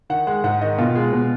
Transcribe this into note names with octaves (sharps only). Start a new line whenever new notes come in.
D#3 F#5
G#3 F#5
G#2 F#5
D#3 D#5
B2 F4
G#3
B2